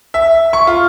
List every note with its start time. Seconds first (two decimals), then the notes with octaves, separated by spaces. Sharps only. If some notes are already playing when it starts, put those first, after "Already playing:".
0.14 E5
0.53 C#6
0.67 F4